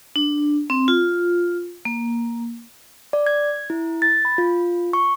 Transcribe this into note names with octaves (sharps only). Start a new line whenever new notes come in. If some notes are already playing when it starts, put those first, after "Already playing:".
D4
C4
F4
A#3
D5
G#6
E4
A6
B5
F4
C#6